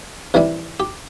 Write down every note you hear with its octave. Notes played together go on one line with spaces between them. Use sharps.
C3 E3 G3 C4
G4